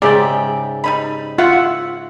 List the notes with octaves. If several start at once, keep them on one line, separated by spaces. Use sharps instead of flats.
G#2 C#3 G4 D5 E5 G5
G3 D#4 B5
F4 E5 F#5